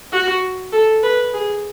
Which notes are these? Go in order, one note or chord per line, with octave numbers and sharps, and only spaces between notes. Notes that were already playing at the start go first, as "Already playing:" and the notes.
F#4
A4
B4
G#4